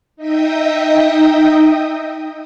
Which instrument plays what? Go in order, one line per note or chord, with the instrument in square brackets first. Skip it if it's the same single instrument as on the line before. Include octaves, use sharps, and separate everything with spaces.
[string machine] D#4 D#5 E5 G5 D#6